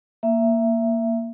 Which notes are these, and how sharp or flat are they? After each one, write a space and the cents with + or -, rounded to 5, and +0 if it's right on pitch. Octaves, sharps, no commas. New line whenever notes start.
A#3 +0 E5 +15